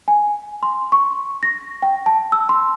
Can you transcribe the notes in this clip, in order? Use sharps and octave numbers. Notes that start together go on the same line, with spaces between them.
G#5
C6
C#6
A#6
G5
A5
E6
C6